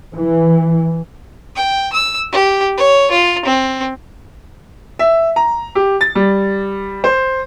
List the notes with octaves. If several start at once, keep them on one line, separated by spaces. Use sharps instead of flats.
E3
G5
E6
G4
C#5
F4
C4
E5
A#5
G4
A6
G3
C5